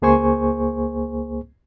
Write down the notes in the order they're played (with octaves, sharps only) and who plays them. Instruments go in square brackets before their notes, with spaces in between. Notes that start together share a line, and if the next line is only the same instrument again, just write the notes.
[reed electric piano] C#2 A#3 G#4 C5 G#5 C#6